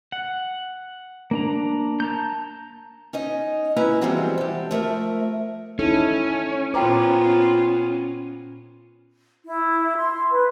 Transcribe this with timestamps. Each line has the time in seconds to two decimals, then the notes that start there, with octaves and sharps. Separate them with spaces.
0.12 F#5
1.31 A#3 D4 A#5
2.00 A5 A#5 G6
3.13 C#4 D#4 D#5
3.76 A#3 C#4 E4 B4 A#5
4.01 E3 F3 G3 G#3 C4 F#4
4.38 G4 A4
4.71 F3 A3 A#4 E5
5.79 C#4 D#4 E4 A4
6.74 A#2 B3 F4 C5 G5 A#5 D6
9.45 E4
9.96 C6
10.31 B4